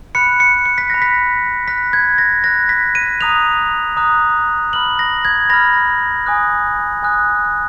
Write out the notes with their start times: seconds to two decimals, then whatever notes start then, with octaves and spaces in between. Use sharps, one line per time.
0.15 B5 F#6 C#7
0.40 C#7
0.66 C#7
0.78 B6
0.90 B5 F#6 A#6
1.02 B6
1.67 B5 F#6 B6
1.93 G#6
2.18 A#6
2.44 B5 F#6 A#6
2.69 B6
2.95 D#7
3.21 A#5 D#6 F#6 F7
3.97 A#5 D#6 F#6
4.73 B5 F6 F#7
4.99 A#6
5.25 G#6
5.50 B5 F6 A#6
6.26 G#5 D#6 F#6
7.03 G#5 D#6 F#6